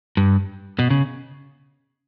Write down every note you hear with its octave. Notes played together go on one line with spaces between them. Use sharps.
G2
B2
C#3